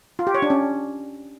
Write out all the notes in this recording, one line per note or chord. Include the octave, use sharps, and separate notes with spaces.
F4
G4
C#5
D4
C#4